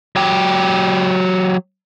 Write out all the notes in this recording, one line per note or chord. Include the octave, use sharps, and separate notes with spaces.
F#3 G4